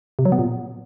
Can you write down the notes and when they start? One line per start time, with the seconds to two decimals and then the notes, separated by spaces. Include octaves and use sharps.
0.19 C3
0.25 F#3
0.32 B3
0.39 A#2